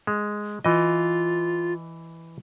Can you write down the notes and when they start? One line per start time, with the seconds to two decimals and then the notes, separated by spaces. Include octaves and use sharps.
0.07 G#3
0.65 E3 F4 D#5